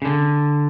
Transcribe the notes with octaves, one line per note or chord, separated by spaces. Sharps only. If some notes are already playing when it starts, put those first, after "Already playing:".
C#3
D3